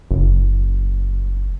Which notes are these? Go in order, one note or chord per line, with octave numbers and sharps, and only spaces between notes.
F#1